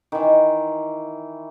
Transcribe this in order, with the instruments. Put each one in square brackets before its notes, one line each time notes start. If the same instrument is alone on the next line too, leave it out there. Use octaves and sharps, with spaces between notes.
[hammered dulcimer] D#3 E3